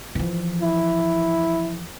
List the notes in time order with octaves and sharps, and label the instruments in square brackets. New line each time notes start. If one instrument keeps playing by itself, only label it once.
[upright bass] E3 F3
[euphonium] E4